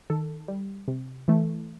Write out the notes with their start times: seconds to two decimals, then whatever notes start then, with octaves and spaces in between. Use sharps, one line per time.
0.10 D#3 A4
0.48 G3
0.88 C3
1.28 E3 A3